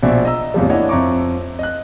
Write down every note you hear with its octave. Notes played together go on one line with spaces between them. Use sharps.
A#1 B2 D5 E5
D#5 A#5 E6
E2 A2 C3 F3 G3
A#3 D4 E4 C#5 D#5 F#5
F2 E5 A#5 C#6 D6
D#5 F#6